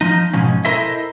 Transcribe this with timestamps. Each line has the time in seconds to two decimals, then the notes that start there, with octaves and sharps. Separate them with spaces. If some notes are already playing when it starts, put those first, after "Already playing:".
0.01 F3 D#4
0.33 G#2 B2 F3 C#4
0.65 E4 A4 A#4 C5 D#5 E5